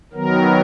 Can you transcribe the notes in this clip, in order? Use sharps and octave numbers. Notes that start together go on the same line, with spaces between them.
D#3 F#3 B3 A#4